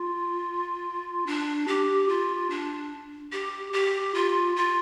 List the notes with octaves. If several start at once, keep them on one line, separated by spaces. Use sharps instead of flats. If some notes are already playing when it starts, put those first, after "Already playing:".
Already playing: F4
D4
G4
F4
D4
G4
G4
F4
F4